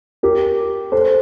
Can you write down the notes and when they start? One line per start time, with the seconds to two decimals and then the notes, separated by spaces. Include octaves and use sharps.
0.23 G4 A#4
0.92 A4 C5